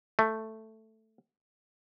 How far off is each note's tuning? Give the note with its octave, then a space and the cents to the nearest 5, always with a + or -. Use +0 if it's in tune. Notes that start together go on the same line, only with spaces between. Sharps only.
A3 +5